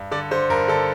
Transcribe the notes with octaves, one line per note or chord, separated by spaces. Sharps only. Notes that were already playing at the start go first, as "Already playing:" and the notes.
Already playing: G2
D3 D5
D3 C5
G2 A#4
D3 A4